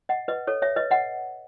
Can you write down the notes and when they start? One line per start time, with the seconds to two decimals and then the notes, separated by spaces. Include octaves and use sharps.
0.09 D#5 F#5
0.28 B4 D#5
0.47 A4 C#5
0.62 C#5 E5
0.76 B4 D#5
0.91 D#5 F#5